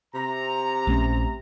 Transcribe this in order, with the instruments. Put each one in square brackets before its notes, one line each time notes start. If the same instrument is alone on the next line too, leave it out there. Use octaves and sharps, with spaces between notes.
[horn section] C3 A#5
[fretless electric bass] A#1 A3 C#4